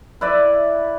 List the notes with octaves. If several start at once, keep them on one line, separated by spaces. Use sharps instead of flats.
E4 B4 D5 E5